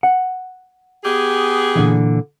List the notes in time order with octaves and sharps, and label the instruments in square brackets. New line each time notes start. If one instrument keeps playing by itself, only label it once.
[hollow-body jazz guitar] F#5
[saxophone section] B3 G4 G#4
[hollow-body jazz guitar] A#2 D3 E3